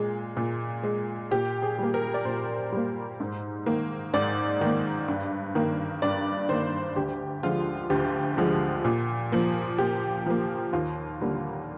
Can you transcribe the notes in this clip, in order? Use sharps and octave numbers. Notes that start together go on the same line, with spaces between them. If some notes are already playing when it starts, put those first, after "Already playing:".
Already playing: A#2 G#3
A#2
G#3
A#2 G4
G#4
G3 A#3
A#4
D5
A#2 C5
G3 A#3
G#2
D#3 A#3
G#2 D5
D#3 A#3
G2
D#3 A#3
G2 D5
D#3 A#3 C5
D2 G4
D3 F3 G#3 F4
D2 G4
D3 F3 G#3
A#2
F3 A#3
A#2 G4
F3 A#3
D#2 F4
D3 G3 A#3